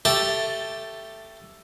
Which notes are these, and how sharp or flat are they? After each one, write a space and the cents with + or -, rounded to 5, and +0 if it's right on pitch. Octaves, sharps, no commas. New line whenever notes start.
A3 +10 G4 +0 A5 +0